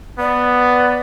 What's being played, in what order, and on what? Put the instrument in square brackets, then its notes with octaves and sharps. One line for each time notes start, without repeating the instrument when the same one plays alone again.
[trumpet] B3 [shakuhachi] D5